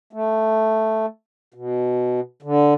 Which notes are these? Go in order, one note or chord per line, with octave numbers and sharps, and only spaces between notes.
A3
B2
D3